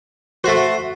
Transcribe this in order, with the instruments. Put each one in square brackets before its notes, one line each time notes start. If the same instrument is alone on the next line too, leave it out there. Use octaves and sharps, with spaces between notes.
[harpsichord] A3 C5 [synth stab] F#4